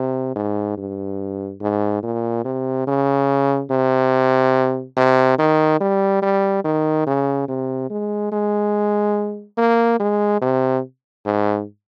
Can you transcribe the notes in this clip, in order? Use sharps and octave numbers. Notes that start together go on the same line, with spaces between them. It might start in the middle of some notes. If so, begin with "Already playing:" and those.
Already playing: C3
G#2
G2
G#2
A#2
C3
C#3
C3
C3
D#3
G3
G3
D#3
C#3
C3
G#3
G#3
A#3
G#3
C3
G#2